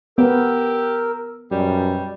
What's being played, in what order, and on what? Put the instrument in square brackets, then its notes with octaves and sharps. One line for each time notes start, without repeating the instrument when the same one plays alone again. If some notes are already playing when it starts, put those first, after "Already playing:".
[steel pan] B3 [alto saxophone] G4 [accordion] A#4 E6
[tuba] F#2 [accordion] B2 [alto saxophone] G3